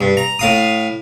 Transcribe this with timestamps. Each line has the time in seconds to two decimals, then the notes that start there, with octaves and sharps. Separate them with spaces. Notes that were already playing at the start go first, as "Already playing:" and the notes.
0.01 G2
0.17 A#5
0.39 A2 F5 D#6